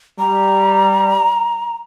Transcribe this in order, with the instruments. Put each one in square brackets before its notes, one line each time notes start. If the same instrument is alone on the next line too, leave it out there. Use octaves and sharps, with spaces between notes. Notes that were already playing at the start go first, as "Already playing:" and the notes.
[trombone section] G3 [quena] A#5